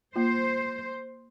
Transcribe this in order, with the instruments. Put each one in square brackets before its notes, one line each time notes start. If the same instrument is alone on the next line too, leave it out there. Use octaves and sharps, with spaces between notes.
[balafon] A#3 F4 [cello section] C5